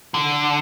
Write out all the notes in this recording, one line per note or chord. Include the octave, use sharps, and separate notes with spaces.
D3